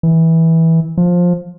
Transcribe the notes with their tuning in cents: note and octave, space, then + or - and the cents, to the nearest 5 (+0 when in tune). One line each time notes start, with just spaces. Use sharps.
E3 -15
F3 +15